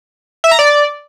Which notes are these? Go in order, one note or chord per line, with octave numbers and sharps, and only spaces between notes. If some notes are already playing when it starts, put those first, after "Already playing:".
E5
A#5
D5